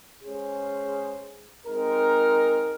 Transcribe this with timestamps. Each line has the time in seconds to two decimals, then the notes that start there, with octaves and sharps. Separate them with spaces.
0.21 G#3 C#4 G#4 C5
1.65 G#3 C4 D#4 A#4